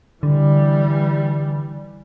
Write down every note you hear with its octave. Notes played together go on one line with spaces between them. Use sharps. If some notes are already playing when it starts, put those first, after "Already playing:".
D3 E3 G3